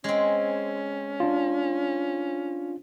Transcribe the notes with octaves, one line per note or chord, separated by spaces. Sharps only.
G#3 C4 C#4
D4 F4